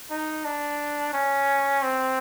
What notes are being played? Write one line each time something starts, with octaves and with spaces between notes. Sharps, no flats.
D#4
D4
C#4
C4